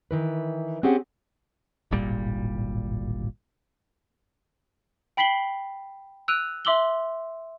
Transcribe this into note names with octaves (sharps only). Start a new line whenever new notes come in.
D#3 E3 B4
C4 C#4 G4 G#4 F#5
D1 G#1 A#2 G3
G5 B5 B6 C7 F#7 G7
E6 F#6 D7 D#7 F7
E5 C6 D6 E6 F#7 G7